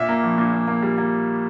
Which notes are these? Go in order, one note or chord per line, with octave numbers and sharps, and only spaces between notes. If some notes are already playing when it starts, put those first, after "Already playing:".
Already playing: A#2 E5
A#3
A#1
A#2
A#2
A#3
G3
A#3